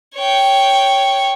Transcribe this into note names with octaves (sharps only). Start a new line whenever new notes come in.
C#5 G5